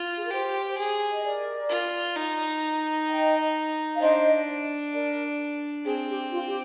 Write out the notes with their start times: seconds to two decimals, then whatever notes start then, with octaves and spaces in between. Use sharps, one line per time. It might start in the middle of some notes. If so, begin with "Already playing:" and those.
Already playing: F4
0.16 G#4
0.23 A#4
0.31 G4 C5
0.78 G#4
1.12 D#5
1.23 A#4 D5
1.69 F4
2.16 D#4
3.08 D#5 G5
3.94 F5
4.00 D4 C5 D#5
4.93 A#4 D5
5.85 C4 G#4
6.08 G4
6.31 F4
6.47 G4